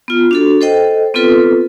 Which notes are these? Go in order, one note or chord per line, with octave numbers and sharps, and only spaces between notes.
B3 F4
D4 F#4 A4
A4 C5 D#5 G5
B3 C4 F4 A4 B4